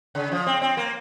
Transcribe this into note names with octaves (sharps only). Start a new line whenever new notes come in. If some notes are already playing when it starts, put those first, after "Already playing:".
C#3
F3
C4
C4
A#3